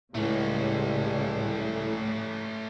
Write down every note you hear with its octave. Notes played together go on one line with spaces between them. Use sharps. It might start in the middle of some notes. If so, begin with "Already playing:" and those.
C#2 A2 C#3 G3 A3 C#4